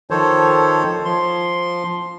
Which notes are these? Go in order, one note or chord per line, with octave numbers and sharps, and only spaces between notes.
D#3 F3 A4 C5 C#5
F3 C6